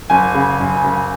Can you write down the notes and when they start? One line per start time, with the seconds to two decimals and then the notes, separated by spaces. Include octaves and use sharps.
0.10 F#1 G#5
0.34 C#3
0.60 F#1
0.84 F#1